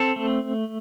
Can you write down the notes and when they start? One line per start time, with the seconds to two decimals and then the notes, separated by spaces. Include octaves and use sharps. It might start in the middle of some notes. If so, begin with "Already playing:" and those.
Already playing: C4 A4
0.16 A3